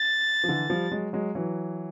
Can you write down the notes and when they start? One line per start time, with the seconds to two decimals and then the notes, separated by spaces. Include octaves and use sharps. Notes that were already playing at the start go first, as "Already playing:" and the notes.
Already playing: A6
0.44 F3
0.48 D3 E3
0.70 F3 G3
0.91 F#3 G#3
1.13 F#3 G#3
1.35 E3 F#3